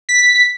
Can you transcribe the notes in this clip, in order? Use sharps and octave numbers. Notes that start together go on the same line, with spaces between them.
B6